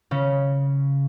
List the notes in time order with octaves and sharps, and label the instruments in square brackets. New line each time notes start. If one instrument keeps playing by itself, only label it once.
[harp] C#3 C#4